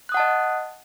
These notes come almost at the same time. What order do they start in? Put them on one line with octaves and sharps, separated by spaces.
F#6 D#6 F#5 A5 D#5